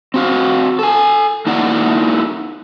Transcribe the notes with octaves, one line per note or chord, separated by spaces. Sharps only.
C4 F#4 F5
A4 G#5
A#3 D#4 E4 F#4 D5 F#5